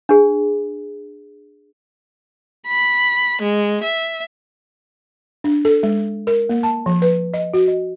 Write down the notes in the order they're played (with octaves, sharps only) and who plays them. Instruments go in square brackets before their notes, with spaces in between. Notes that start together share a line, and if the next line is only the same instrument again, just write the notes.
[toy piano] D4 G#4
[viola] B5
G#3
E5
[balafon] D4
A4
G#3
A#4
A#3
A5
F3
B4
D#5
F#4
D#5